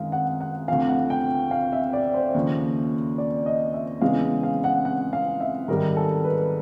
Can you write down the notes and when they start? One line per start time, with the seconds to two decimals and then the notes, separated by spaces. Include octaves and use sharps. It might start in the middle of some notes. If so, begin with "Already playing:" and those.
Already playing: F#2 D#3 G#3 F5
0.12 F#5
0.41 F#5
0.68 D2 C3 F3 F5
0.89 F#5
1.10 G5
1.51 F5
1.72 E5
1.93 D5
2.14 C5
2.34 D#2 C#3 F3
3.18 D5
3.46 D#5
3.74 E5
4.01 E2 C#3 E3 G#3 F5
4.43 F5
4.64 F#5
4.85 F#5
5.13 F5
5.40 E5
5.68 G#2 D#3 G3 A#4
5.97 A4
6.24 B4